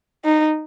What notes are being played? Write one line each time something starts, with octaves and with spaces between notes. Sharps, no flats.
D#4